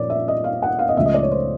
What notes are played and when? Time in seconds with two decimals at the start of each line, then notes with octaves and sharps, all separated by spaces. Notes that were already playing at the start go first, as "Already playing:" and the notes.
Already playing: A#2 F3 C#5 D5
0.10 E5
0.28 D#5
0.44 F5
0.62 F#5
0.79 F5
0.89 D#5
0.97 C#2 C#3 F3 A3 E5
1.05 D#5
1.14 D5
1.23 C#5
1.31 C5